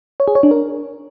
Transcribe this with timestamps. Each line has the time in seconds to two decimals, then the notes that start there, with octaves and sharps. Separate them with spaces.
0.20 C#5
0.28 G#4
0.35 C#5
0.43 D4
0.51 A#4